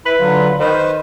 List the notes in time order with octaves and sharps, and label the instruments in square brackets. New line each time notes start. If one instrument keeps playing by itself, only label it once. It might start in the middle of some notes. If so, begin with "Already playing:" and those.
[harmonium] E4 [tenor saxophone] B4
[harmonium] D3 F#3 F4
[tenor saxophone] D#3 [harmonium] B4 C5